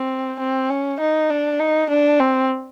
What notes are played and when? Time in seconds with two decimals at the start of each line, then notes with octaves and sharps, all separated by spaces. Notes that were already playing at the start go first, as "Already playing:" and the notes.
Already playing: C4
0.40 C4
0.70 C#4
1.00 D#4
1.30 D4
1.60 D#4
1.90 D4
2.20 C4